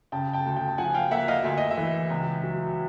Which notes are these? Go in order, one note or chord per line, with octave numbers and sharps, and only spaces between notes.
C#3 G5 A5
G5 A5
D2
G5 A5
A5
F3 F#5 G#5
F5 G5
A#3 E5 F#5
D#5 F5
D2 E5
D#5
E5
E3
C#2
F#3